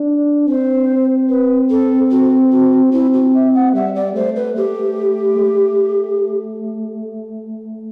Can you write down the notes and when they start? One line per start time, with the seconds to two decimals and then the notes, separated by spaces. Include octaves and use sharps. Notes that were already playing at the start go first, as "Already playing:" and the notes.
Already playing: D4
0.47 C4 C5
1.29 B4
1.70 A4
2.11 F#4
2.52 F#4
2.93 C4 E4
3.13 F#4
3.34 E5
3.55 F#5
3.75 G3 E5
3.95 D5
4.15 A3 C5
4.36 B4
4.56 A3 G4
5.37 A3